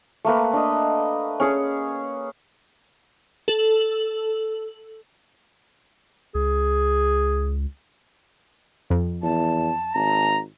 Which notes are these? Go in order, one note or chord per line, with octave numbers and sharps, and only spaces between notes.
A3 A#3 B4
D4 D#5
C#4 G#4 C#5
A4 F#7
C#2 G#4
F2
E2 A5
G#1 A#5